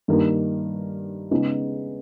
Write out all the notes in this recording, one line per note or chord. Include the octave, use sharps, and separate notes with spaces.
G2 D#3 A#3 D#4 A#4
C#3 G#3 B3 D#4 G#4